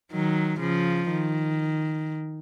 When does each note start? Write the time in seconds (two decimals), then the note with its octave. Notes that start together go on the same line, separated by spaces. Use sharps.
0.12 D#3 F#3
0.60 C#3 F3
1.10 D#3